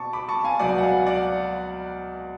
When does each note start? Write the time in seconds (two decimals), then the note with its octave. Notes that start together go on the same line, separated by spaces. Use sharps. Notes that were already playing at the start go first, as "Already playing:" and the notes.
Already playing: B2 A5 C#6 D6
0.13 B5 D6
0.29 A5 C#6
0.44 F5 G#5
0.59 C#2 B2 F#3 B3 D5 F#5
0.78 F#5
0.83 F5 G#5
1.06 D5 F#5